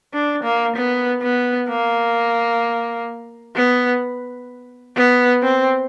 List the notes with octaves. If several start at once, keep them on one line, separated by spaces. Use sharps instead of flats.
D4
A#3
B3
B3
A#3
B3
B3
C4